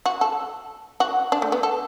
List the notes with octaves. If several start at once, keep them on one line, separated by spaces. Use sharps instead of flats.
F#4
A4
F#4
D4
A3
B3
A4